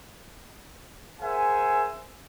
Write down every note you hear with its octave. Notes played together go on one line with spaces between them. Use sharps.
G#4 A#4 C5 E5 F#5 G#5